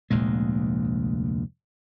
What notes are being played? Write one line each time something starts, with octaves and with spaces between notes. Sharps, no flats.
F1 D2 A#2 G#3